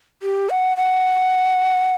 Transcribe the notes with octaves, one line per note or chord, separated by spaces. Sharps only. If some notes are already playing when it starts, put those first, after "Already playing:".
G4
F#5
F#5